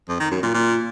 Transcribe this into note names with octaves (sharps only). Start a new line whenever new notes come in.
F2
D#3
F#2
A#2
A#2